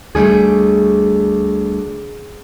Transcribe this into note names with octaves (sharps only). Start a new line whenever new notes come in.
D2 G3 A3 G#4